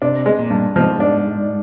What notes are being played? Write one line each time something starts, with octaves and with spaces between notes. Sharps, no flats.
C3 D4
G#3
A#2
G2
G#2 F3
D4